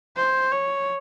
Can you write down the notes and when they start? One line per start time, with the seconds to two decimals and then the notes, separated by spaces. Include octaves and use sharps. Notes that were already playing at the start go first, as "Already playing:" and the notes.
0.16 C5
0.52 C#5